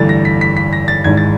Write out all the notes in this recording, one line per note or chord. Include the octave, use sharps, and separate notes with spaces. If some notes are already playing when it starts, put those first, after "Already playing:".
Already playing: G1 G2 E3 A3 A6
A#6
B6
B6
B6
A#6
A6
G#1 G#2 E3 G#6
A6